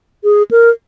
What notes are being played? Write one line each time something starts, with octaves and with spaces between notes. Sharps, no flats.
G#4
A#4